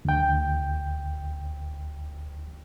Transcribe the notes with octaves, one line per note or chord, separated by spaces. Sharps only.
D2 G5